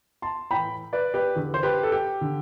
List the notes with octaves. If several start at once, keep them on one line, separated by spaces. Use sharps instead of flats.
A5 C6
A2 E3 G5 B5
B4 D5
G4 B4
E2 D3
C5
G4 B4
A4
G4
D3